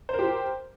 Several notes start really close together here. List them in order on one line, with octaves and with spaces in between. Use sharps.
C5 A#4 G4